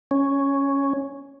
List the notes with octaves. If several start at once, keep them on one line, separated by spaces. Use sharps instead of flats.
C#4